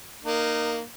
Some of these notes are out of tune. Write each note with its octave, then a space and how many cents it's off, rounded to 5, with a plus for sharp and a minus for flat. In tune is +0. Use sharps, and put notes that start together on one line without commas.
A#3 +0 D#4 -20